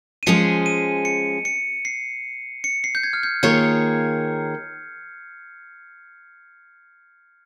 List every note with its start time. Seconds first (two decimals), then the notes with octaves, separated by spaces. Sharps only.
0.23 D#7
0.26 F3 G#3 C#4 G#4 C#7
0.66 D#7
1.05 C#7
1.45 C#7
1.85 C7
2.64 C#7
2.84 C7
2.95 G6
3.03 G#6
3.13 F6
3.23 G6
3.43 D#3 A#3 F4 G#4 C#5 G6